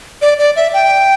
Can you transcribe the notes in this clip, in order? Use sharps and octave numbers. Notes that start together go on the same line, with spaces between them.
D5
D5
E5
G5